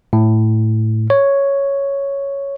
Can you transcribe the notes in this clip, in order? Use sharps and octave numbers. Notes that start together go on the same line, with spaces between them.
A2
C#5